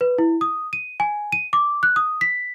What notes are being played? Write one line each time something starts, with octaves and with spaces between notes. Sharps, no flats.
B4
E4
D#6
D#7
G#5
D#7
D6
F#6
D#6
B6